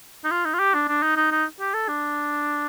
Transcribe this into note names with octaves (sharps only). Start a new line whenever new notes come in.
D#4
F4
D#4
F4
G4
D4
D4
D#4
D#4
D#4
G4
A4
D4